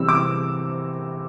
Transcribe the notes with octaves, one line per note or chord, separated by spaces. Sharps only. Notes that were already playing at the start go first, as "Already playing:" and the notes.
Already playing: C3 E3 G3 C4 E6
D6